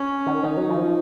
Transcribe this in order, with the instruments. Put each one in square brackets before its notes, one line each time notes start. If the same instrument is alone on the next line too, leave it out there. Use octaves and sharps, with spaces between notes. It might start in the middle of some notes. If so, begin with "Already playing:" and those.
Already playing: [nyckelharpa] C#4
[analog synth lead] D#3
[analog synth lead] D#3 [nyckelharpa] D#4
[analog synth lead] F#3
F3